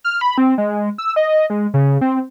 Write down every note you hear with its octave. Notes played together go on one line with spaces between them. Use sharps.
F6
B5
C4
G#3
E6
D#5
G#3
C#3
C4